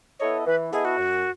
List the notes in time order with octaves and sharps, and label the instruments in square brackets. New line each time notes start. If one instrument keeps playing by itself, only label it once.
[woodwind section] B3 E4 A4 D#5 [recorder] C#5
[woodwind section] E3 [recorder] B4
[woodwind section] B3 E4 A4 D#5 [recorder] G#4
[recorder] F#4
[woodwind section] F#2